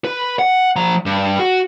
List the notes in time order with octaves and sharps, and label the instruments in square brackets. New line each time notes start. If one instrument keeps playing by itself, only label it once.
[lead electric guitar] B4
F#5
F3 A#5
G2
F#4